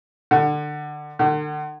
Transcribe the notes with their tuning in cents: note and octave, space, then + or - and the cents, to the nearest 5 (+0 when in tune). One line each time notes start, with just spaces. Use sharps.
D3 +25
D3 +45